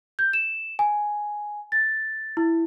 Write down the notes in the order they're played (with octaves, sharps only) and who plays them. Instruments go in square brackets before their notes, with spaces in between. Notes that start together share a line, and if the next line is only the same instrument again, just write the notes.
[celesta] G6
E7
G#5
A6
E4